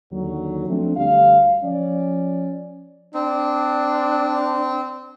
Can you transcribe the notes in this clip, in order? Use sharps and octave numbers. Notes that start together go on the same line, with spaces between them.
D#2 D3 F#3
F3 A3 C4 D4
D2 G3 F5
F3 C#4 D5
C4 D4